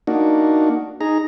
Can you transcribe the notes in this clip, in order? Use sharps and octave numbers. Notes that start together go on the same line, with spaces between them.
A#3 D4 D#4 F#4
D#4 G#4 A#5